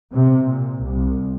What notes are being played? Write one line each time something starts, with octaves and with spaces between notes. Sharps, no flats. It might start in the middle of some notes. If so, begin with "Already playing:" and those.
C3
A#2
C2